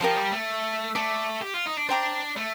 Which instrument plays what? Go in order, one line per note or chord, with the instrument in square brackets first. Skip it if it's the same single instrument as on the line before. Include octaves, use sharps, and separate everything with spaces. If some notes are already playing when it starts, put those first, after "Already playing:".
[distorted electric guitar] F3 [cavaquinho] G4 A#4 F5 A5
[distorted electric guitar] G3
A3
[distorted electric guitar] A3 [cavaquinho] D5 A5 D6
[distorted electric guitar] G4
F4
D#4
D4
[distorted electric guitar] D4 [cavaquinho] C5 G5 A#5 D6
[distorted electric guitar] A3